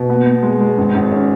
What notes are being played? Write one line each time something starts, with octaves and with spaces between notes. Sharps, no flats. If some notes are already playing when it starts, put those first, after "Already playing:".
Already playing: B2
B3
B3
G#3
G#3
G#1
G#1
C#4